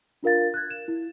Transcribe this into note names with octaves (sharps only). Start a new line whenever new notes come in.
D4 F4 A#4 F5 A6
F#6 G#6
E7
E4